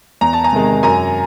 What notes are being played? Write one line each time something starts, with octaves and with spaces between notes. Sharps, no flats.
E2 A#5
A5
G#5 A#5
C3 D#3 G#3
F#2 G#5 A#5